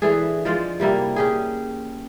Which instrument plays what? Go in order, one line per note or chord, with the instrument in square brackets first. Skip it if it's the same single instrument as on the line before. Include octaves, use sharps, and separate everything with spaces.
[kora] E3 A3 D4 G#4
F3 G#3 F4 D5
C3 G3 A#3 E4
C#4 G4 G#4